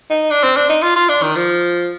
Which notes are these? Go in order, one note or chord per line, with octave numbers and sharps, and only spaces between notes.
D#4
D4
C4
D4
D#4
F4
F4
D4
D#3
F3